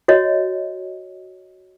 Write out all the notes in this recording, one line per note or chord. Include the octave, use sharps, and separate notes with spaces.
F#4 C#5 D#5